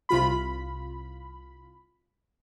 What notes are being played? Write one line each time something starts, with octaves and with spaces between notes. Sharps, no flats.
C2 F4 B5